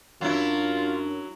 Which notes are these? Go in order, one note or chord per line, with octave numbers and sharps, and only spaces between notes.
F#2 F#3 D4 E4 F4